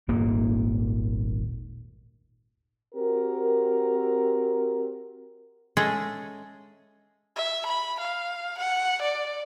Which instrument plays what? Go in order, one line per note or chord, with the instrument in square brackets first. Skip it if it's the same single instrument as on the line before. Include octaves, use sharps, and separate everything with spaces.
[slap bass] D#1 G#1 A#2 A#3
[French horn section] C4 F#4 G4 A#4
[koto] G#3 C#4 G#4 A4 D#5 E5
[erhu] E5
B5
F5
F#5
D5